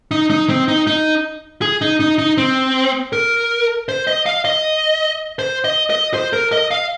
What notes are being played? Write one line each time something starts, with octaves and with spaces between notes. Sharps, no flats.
D#4
D#4
C4
D#4
D#4
G#4
D#4
D#4
D#4
C4
A#4
C5
D#5
F5
D#5
C5
D#5
D#5
C5
A#4
D#5
F5